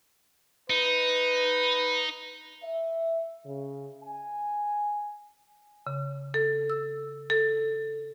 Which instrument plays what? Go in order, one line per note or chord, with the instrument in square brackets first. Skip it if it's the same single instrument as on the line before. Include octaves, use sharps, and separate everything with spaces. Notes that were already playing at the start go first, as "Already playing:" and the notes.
[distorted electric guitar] D#4 [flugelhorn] B4
[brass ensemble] E5
C#3
G#5
[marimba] C#3
A4
E6
A4